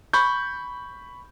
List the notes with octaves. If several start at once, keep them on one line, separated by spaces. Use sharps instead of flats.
B5 C#6 G6